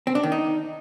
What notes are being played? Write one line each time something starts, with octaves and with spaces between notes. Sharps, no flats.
C4
D4
D#3
D#4